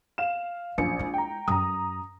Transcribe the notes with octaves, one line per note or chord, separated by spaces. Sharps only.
F5 E7
A#1 F#2 C#4 C#7
G#3 E4
G5 A#5
F#2 A#5 D#6